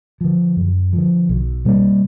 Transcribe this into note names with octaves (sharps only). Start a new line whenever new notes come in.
D3 F3
F#2
D3 F3
B1
B2 G3 A#3